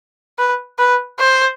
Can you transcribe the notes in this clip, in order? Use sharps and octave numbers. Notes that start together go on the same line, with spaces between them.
B4
B4
C5